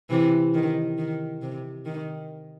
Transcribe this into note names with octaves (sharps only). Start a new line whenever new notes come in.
C3 E3
D#3
D#3
C3
D#3